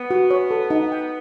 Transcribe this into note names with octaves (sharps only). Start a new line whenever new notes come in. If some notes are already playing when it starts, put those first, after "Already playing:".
Already playing: B3
F#4
C#5
A4
D#4
G5